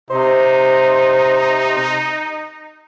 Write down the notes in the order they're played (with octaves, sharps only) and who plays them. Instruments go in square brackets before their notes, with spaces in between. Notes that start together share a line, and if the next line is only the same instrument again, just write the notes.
[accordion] C3 [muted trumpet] D#4 [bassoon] C5